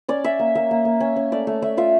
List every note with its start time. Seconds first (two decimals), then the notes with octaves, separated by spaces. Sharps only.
0.08 C#4 D5
0.24 C#4 E5
0.39 A#3
0.55 A#3 E5
0.71 A#3
0.85 A#3
1.00 C#4
1.16 C#4
1.32 A3 D5
1.47 A3
1.62 A3 E5
1.77 F4 E5